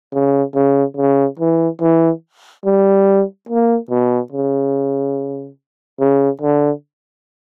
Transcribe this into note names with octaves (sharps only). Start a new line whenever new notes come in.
C#3
C#3
C#3
E3
E3
G3
A#3
B2
C#3
C#3
D3